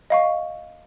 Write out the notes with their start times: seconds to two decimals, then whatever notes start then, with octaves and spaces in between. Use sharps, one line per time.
0.10 D#5 F5 C#6